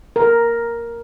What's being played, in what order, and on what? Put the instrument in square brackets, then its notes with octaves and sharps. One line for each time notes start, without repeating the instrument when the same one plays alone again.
[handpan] A#4